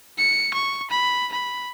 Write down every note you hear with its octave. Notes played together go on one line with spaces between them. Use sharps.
C#7
C#6
B5
B5